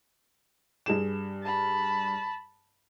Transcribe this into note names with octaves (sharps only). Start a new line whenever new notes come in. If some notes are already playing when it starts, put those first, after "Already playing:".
G2 G#4 E7
A5 B5